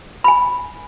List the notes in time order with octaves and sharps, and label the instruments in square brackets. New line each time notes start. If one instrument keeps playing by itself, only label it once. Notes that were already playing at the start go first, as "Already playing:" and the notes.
[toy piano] G#5 B5